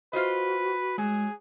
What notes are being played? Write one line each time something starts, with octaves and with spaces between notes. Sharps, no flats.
F4 F#4 B4 C5 D#5
F#3 G#3 G#4